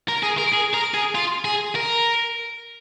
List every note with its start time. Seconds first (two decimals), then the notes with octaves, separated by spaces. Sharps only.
0.09 A#4
0.23 G#4
0.38 A#4
0.53 G#4
0.74 A#4
0.94 G#4
1.15 F4
1.45 G#4
1.75 A#4